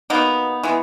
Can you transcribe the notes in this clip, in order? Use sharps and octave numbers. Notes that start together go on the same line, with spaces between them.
B2 A#3 B3 D#4
E3 G#3 B3